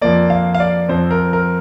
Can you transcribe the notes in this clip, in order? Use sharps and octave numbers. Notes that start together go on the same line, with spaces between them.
F2 F3 A#3 D5
F5
F5
D5
F2 F3 C4 C5
A#4
A#4